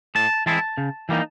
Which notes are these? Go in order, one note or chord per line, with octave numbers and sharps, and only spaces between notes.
A2 A5
E3 G#3 C4 E4 A5
C#3
E3 G3 A#3 D#4